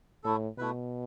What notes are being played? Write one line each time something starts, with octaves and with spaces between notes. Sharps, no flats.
A2 A3 E4 A4
B2 A3 E4 B4